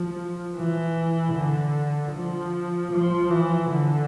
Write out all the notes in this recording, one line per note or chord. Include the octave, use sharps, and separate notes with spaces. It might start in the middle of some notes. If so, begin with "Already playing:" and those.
Already playing: F3
E3
D3
F3
F3
E3
D3